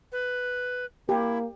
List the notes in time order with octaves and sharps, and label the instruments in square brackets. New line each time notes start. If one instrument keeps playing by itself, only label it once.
[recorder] B4
[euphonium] A#3 [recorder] E4 [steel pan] G4